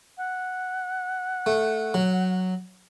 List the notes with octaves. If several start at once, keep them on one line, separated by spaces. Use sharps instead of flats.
F#5
A3
F#3